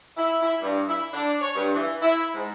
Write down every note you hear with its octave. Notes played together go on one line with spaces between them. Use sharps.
E4
E4
G2
E4
D4
C#5
G2
E3
E4
G#2